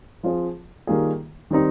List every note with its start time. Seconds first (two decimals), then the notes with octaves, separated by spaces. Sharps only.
0.23 F3 C4 F4 G#4 C5
0.87 D#3 G3 A#3 F4 G#4
1.51 D#3 G3 C4 D#4